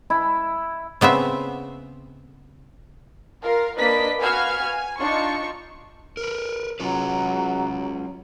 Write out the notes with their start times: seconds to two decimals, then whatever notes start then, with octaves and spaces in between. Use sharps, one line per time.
0.10 E4
1.01 C#3 B3 C4 E5
3.43 F4 A#4 F5
3.78 A#3 D4 B4 D5 D#5 B6
4.20 F#4 B4 F5 G#5 F6 G#6
4.63 G#5
4.99 D4 D#4 F4 C#6
6.17 A#4 B4
6.80 F#3 C#4 F4 B4